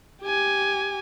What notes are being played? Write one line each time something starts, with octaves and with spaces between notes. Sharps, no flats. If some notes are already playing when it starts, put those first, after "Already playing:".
G4 G#5